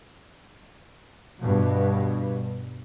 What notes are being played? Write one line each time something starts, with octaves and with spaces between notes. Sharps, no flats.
G2 B2